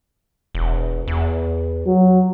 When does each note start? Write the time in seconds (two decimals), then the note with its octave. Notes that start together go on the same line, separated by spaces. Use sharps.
0.55 E1
1.08 E2
1.86 F#3